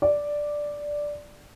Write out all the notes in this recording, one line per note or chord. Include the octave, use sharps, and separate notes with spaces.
D5